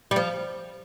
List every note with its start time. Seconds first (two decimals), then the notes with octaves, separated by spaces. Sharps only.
0.11 G3
0.16 F3